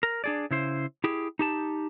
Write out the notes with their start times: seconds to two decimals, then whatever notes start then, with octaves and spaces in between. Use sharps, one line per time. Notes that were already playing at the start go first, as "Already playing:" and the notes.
0.03 A#4
0.24 D4 G#4 D5
0.51 C#3 E4 C5
1.04 E4 G4 G#4
1.39 D#4 G4 A5